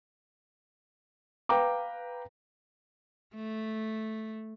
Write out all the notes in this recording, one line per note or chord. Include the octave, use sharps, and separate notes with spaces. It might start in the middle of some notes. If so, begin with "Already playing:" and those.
B4 F5 G5 A#5 D6
A3